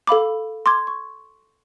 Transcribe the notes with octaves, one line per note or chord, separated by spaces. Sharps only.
A4 F5 B5 D6
C6 D6 G#6
C#6